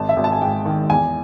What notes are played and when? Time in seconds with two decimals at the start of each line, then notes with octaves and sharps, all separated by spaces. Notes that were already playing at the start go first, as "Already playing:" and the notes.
Already playing: G#1 A5
0.09 E5
0.17 G#1
0.24 A5
0.32 G#5
0.41 G#2 G5
0.65 D#3
0.90 E2 G#5